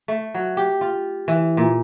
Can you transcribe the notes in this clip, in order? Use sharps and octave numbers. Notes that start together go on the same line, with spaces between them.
A3
F#3
G4
F4
E3
A#2